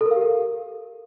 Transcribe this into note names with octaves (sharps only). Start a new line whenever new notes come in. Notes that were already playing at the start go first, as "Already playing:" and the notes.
A4
A#4
F5
G4
A#4